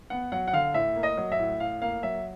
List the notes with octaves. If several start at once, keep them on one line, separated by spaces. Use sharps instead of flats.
B3 F#5
F#3 F#5
F#5
D3 F5
A2 E5
A#3
D#5
F#3
E5
A2
A2 F5
A#3 F5
F#3 E5